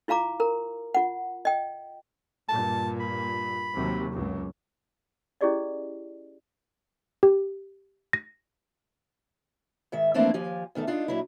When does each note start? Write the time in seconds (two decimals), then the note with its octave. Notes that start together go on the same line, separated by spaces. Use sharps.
0.08 E4 F4 F5 A#5 D6
0.40 A#4 A#5
0.95 F4 F#5
1.45 D#5 G5
2.49 G2 A#2 A5
3.00 B5
3.76 D#2 C3 F#3
4.12 C#2 F#2
5.41 C#4 E4 G4 G#4 D5 D#5
7.23 G4
8.13 A#6
9.92 G#2 D#3 E5
10.14 E3 F3 A3 A#3 C4 D4
10.34 D#2 F3 G4 G#5
10.75 E2 D#3 A3 A4
10.87 D4 D#4 F4
11.08 A#2 F#3 E4